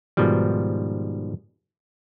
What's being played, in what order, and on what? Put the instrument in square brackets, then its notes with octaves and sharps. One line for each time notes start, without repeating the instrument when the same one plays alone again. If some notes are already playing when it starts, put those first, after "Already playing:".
[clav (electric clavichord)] G#2 B2 D#3 F3 G3